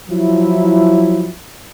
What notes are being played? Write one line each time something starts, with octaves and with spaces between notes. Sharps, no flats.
F3 F#3 E4